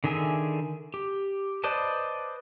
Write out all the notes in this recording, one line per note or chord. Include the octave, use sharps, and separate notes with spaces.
D3 D#3 G#4 E5 G#5
G4
B4 C5 D5 D#5 A5